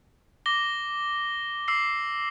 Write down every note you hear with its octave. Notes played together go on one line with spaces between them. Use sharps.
D6 A#6 G7
D6 E6 C7